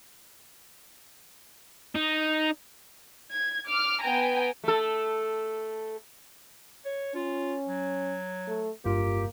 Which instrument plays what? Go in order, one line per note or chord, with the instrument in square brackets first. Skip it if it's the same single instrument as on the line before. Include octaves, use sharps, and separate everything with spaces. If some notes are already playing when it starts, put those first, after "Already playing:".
[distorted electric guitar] D#4
[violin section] G#6
D6 F6
B3 G5 G#5 A#5
[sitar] A3 A4
[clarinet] C#5
[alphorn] C#4 [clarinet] F4
[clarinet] F#3
[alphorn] A3
[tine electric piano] G1 G2 F4 [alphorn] A#3 [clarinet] G4